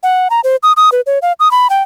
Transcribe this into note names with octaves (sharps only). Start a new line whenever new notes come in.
F#5
A#5
C5
D#6
D#6
B4
C#5
F5
D#6
B5
G5